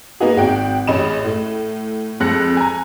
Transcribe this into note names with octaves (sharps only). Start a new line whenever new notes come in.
A#3 B3 D#4 F#4 G#4
G#1 F#4 G5
A1 C#4 G#4 D#5 B5 E7
A2
F2 G#3 F#6 A#6 C#7
G#5 A#5